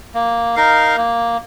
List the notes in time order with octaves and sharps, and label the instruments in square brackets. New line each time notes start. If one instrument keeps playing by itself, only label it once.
[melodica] A#3
D#4 A#4 F5
A#3